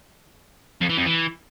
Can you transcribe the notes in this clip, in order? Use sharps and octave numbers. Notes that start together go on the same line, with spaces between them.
F2
E3
F2
E3